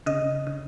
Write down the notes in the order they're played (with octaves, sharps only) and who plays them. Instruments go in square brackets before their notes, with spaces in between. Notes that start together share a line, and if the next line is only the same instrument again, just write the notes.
[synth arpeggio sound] C#3 D#5
C#3